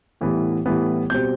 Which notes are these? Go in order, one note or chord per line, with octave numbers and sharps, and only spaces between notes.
A2 E3 G3 B3
A2 E3 G3 B3
B2 G3 C4 G6